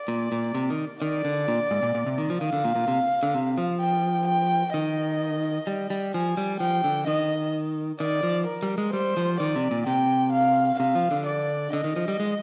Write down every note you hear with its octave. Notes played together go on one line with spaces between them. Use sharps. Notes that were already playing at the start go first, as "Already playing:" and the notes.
Already playing: D5
A#2
A#2
C3
D#3
D#3 D5
D3
A#2
G#2
A#2
A#2
C3
D#3
F3
D#3 F5
D3
A#2
A#2
C3
D3
C3
F3
G5
G5
D#3 D#5
G3
G3
F3 G#5
G3
F3 G5
D3
D#3 D#5
D#3 D5
F3
A#4
G3
G#3
G3 C5
F3
D#3 D5
C3
A#2
C3 G5
F5
C3 F5
F3
D3
D5
D3 D#5
D#3
F3
G3
G#3